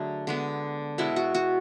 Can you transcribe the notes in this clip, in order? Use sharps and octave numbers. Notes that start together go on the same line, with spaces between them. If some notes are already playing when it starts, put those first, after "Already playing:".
Already playing: D3 F#3 A3 G#4
D3 G#3 B3
B2 G#3 B3 E4
F#4
F#4